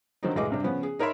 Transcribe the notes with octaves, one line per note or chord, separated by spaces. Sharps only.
D3 D#3 F3 F#3 C4 D#4
F1 B1 A2 G#3 D#5 D6
G2 C3 D4
C#3 F3 B3 C#4
G#4
D#4 A#4 C#5 E5 B5 C6